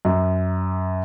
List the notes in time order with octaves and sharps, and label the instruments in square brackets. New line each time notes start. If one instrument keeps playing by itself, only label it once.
[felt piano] F#2